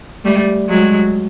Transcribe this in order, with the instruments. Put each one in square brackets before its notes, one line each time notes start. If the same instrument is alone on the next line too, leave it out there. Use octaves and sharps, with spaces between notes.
[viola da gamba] G3 A3
F#3 G#3